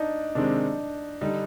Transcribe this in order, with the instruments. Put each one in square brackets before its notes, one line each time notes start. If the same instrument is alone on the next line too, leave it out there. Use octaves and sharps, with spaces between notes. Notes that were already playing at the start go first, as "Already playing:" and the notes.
Already playing: [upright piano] D4 D#4
[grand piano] C3 D#3 G#3 C4 [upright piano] D4
[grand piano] D3 G3 D4 [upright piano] D#4